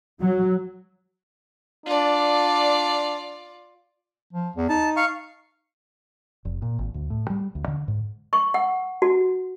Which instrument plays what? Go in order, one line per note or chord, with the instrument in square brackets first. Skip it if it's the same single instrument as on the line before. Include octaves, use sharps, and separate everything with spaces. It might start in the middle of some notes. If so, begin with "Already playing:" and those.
[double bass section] F#3
[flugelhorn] D4 [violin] F4 D5
[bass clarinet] F3
E2
[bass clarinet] D#4 [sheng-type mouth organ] A5
[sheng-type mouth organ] F5 C#6
[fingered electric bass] F1
A#2
G#1
D2
A2
G3
D2
D3
G#2
[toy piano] C#6
F#5
F#4